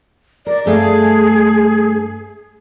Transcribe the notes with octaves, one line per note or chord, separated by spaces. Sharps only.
A#4 D5
G2 A3 G#4 F5